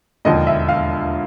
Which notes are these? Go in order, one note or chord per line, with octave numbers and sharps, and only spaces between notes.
E1 D#2 D3 F3 D#5
E5
F5